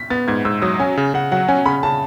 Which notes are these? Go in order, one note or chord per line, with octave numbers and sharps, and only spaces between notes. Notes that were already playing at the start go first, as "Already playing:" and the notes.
Already playing: B6
B3 A6
G#2 G#6
G#2 E6
F#3 D#6
C#4 G#5
C#3
C#3 F#5
F#3 F#5
C#4 G#5
C#3 B5
C#3 A5